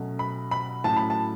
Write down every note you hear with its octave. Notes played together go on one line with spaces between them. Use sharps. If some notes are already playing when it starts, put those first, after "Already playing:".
Already playing: B2 F#3 A3 C#4
B5
B5
A2 F#3 C#4 A5
B5
A5